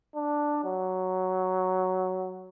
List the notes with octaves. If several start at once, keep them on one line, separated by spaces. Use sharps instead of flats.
D4
F#3